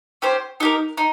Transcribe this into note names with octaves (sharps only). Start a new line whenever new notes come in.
C#4 G4 C5
D#4 G4 A#4
D#4